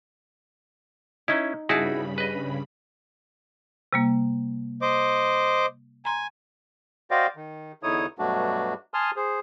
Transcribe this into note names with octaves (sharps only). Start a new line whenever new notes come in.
C#4 D#4 E4
G2 C#3 D#4 E4 F#4 G#4 A5 B5
B4 D#5
C3 G3 A#3
C5 D#5 D6
G#5 A#5 C6
F#4 C5 D5 D#5 F5 G5
D#3
E2 D3 D#4 E4 C#5 D#6
G2 B2 F#3 A3 D4 F#4
G#5 A5 C6 D#6 F6
G#4 C5